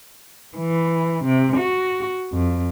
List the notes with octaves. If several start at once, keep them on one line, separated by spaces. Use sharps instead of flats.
E3
C3
F#4
F2